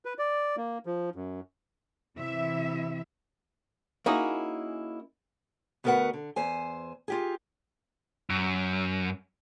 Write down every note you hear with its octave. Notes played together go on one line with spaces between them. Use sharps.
B4
D5
A#3
F3
F#2
C3 E3 E4 E5
A#3 C#4 D#4 E4 F#4 G#4
D2 B3 F#4 A#4 B4 F#5
D3
E2 C5 G#5
F4 G4 G#4
F#2